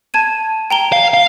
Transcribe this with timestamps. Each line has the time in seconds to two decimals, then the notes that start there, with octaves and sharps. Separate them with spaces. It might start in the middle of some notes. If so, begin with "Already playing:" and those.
0.14 A5 G#6 D#7
0.70 G5 A#5 G7
0.92 F5
1.14 F5